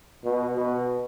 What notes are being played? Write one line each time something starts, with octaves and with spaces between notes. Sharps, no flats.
B2
B2